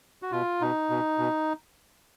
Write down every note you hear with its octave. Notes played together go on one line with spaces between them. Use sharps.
F#4
B2 F4
B2 D#4
B2
B2